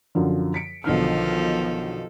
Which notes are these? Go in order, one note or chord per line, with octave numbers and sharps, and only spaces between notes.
F#2 D3 F3
B6 C#7 D7
B1 D3 D#3 F3 A4 F6